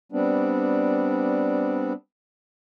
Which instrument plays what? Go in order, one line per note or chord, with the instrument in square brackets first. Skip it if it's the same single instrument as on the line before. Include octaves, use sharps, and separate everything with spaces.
[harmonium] G3 B3 C4 D4